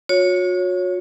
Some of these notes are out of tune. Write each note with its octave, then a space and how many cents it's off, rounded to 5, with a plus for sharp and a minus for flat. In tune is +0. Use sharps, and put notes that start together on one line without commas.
F#4 -40 C#5 +0